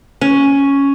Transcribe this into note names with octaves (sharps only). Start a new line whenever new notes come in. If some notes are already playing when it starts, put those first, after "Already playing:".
C#4